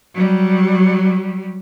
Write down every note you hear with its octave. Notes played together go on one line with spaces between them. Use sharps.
F#3 G3